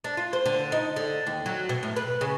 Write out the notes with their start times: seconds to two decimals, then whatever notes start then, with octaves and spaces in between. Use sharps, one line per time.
0.04 D4
0.17 F4
0.33 C5
0.46 D3
0.72 D#4
0.96 D3
1.27 D#2
1.46 F#3
1.69 B2
1.83 A2
1.96 B4
2.21 C#3